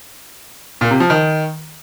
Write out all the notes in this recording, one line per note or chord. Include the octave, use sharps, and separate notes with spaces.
A#2
C3
F3
D#3